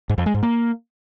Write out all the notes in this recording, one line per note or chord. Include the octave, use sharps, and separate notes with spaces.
G#2
F2
G#3
G#2
A#3